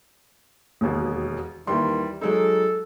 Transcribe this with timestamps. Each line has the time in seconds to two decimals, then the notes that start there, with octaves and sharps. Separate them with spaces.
0.81 E1 D#2 B2
1.67 D#2 D#3 E3 G3 C6
2.21 F#3 G#3 D#4 A4